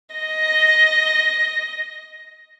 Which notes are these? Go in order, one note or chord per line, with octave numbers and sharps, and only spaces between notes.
D#5 A#6